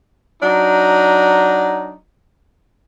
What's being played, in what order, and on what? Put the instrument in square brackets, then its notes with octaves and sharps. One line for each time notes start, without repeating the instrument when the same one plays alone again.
[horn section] F#3 D4 D#4